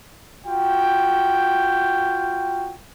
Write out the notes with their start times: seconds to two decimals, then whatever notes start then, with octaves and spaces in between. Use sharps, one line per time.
0.47 F4 F#4 G5